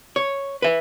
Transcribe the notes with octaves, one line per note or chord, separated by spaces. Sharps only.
C#5
B4 E5